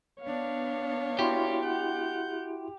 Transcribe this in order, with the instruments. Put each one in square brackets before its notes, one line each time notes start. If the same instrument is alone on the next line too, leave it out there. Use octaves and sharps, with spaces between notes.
[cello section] B3 D4 [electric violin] C#5 F5
[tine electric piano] E4 F#4 C6 [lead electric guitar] G4
[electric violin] F#5 G6